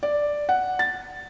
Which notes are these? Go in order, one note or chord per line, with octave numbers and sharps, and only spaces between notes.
D5
F#5
A6